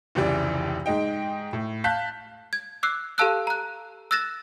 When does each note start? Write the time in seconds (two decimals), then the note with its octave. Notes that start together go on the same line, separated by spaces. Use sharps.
0.15 F1 C#2 E3 G4 D5
0.86 G#2 G#3 D#4 G5
1.53 A2
1.84 F5 A5 F#6 G6 B6
2.53 G#6
2.83 D6 E6 F#6 C7
3.18 G4 A4 F5 A5 E6 F#6
3.47 A#5 F#6
4.11 E6 F#6 A6 A#6 E7